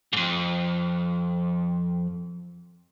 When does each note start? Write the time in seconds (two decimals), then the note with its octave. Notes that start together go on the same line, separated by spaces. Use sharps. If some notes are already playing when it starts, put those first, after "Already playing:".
0.13 F2 G#2